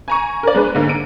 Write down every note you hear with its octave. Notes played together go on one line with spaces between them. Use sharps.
G#5 A#5 C#6
A#4 D5
G#3 D4 G#4 B4
G#2 D3 A#3
D7